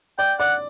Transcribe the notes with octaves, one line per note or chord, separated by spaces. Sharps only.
D5 G5
D5 F#5